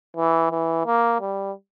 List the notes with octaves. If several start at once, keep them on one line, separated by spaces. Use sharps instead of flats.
E3
E3
A#3
G3